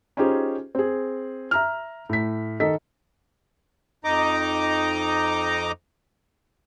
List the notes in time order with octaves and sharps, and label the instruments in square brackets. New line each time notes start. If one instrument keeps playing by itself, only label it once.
[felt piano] C#4 D#4 F4 G4 G#4 C5
C4 G#4
E5 A#5 F6
A2 B6
D#3 A4 D#5 B6
[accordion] F2 D#4 D#5 A#5 D6